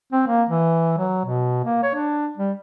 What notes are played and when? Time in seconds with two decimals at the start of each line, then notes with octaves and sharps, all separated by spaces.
0.12 C4
0.27 A#3
0.49 E3
0.98 F#3
1.25 B2
1.65 A#3
1.83 C#5
1.95 D4
2.38 G3